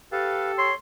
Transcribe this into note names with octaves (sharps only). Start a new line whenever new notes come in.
G4 A4 B4 F5
C#5 C6